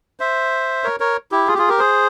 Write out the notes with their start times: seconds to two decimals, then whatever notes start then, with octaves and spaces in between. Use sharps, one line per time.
0.20 C5 E5
0.84 A#4 C#5
1.00 A#4 C#5
1.31 E4 G4
1.47 F4 G#4
1.54 G4
1.58 F4 G#4
1.68 G4 A#4
1.79 G#4 C5